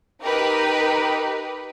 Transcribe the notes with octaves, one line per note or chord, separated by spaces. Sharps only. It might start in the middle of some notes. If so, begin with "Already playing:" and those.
D#4 G4 A#4 B4